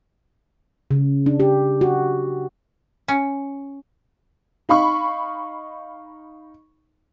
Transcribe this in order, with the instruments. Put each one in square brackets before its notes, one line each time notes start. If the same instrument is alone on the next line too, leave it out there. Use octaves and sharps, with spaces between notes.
[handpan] C#3
D4
G4
F#4
[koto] C#4
[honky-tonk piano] D#4 F5 B5 C#6